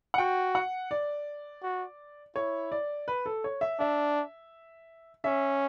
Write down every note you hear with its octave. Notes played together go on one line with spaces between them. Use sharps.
F#5
F#4 G5
F#5
D5
F#4
E4 C#5
D5
B4
A4
C#5
E5
D4 E5
C#4 E5